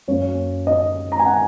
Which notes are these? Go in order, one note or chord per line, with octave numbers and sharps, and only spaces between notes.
F#2 F#3 A#3 C#4 C#5
D#5
A#5
G#5
F#5